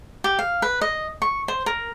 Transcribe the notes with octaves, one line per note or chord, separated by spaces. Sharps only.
G4
F5
B4
D#5
C#6
C5
A#4